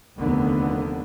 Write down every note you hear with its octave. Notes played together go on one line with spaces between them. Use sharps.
F1 D#2 D3 B3